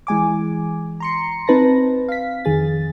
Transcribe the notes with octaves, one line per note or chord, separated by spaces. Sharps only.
E3 G#3 G#5 D6
A#5 C6 C#7
C4 D#4 B4 A5 A#6
F5 B6
F2 D#3 G#4 A6